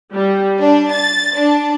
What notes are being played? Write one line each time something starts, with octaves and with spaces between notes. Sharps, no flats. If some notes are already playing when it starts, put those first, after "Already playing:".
G3
D4
A6
D4